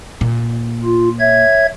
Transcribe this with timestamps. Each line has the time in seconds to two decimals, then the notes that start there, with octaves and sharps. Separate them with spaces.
0.21 A#2
0.84 F4
1.20 C#5 E5 G#6